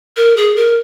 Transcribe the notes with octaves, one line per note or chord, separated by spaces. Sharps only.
A#4
G#4
A#4